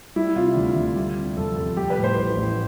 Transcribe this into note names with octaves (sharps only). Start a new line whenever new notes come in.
G3 E4
C3 F4
D2
D2
G3
C3
F2 A4
F2 A4
G3 G4
B4
A2
C5
A1
A1